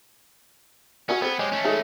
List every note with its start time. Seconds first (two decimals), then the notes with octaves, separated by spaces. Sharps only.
1.09 C#4 F#4 E5 F#5
1.22 B3 C4 A4 G#6
1.39 G#3 G4 C#5 D#5 G#5
1.52 A3 C#4
1.65 G#3 D#4 A4 E5